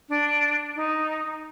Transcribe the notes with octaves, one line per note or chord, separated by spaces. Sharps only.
D4
D#4